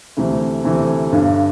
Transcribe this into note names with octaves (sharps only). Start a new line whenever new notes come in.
D2 C3 E3 A3
D2 C3 E3 A3
G1 G2 D3